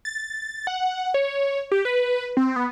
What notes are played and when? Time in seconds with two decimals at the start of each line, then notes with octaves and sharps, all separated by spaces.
0.05 A6
0.67 F#5
1.14 C#5
1.72 G4
1.85 B4
2.37 C4
2.56 B3